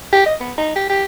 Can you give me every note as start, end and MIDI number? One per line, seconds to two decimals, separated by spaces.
0.13 0.25 67
0.26 0.35 75
0.41 0.52 59
0.58 0.71 63
0.76 0.86 67
0.90 1.05 67